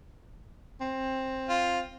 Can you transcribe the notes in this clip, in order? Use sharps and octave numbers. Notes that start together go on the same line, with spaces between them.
C4
F4